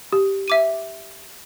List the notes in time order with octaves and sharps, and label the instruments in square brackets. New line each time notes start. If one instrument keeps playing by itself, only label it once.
[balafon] G4
[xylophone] E5 D6 D#7